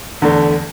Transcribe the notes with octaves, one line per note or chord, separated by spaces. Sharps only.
E2 D3 A3